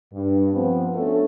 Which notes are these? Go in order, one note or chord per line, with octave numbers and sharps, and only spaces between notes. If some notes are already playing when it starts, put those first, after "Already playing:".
G2
F3 B3 C4
A3 C#4 D4 F#4 A4